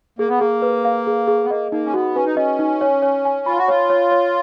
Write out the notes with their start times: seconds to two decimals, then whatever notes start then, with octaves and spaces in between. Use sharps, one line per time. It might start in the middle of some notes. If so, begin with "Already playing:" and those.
0.19 A#3 G#4
0.29 B3
0.39 A#3 G#4
0.62 B4
0.85 F5
1.07 G#4
1.28 G#4
1.44 B3
1.50 A#3 D#5
1.72 A#3 D#4
1.86 C#4
1.94 B3 F#4
2.15 C#4 B4
2.26 D#4
2.35 C#4 D#5
2.59 D#4
2.81 C#5
3.02 C#5
3.25 G#5
3.46 F4 B5
3.58 F#4
3.68 F4 C#5
3.90 C#5
4.11 C#5